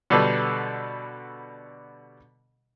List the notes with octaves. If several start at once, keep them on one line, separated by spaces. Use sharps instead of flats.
B2 D3 G3 A4 B4